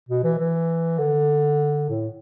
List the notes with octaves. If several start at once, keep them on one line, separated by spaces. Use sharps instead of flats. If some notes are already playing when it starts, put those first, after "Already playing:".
B2
E3
E3
D3
A2